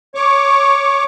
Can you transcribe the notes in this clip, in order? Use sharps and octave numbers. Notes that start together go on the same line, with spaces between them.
C#5 C#6 D6